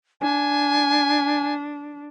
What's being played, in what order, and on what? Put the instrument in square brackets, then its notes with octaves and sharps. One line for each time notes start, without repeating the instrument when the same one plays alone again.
[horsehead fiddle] D4 [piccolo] G#5